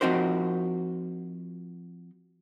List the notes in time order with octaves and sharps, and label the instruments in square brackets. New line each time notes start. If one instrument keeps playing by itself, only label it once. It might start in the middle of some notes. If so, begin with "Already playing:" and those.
[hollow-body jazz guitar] F3 C4 D#4 F#4 A#4 C5